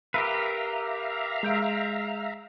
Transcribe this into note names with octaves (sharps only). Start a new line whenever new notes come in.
G4 A#4 B4 E5 F5 A#5
G#3 G6 D7